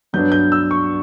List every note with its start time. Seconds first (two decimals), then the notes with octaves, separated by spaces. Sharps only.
0.13 G2 F#3 B3 D4 G6
0.32 G6
0.52 E6
0.71 C#6